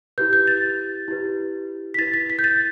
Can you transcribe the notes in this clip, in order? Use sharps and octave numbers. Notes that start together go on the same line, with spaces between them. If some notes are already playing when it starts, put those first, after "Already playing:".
E4 G4 B4 G6
G6
A6
E4 G4 B4
B6
E4 B4 A6
B6
B6
G6
A6